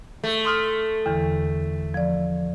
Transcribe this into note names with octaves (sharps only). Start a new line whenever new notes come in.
A3
C6 D#6 F6
E2 D3 E3
F3 D5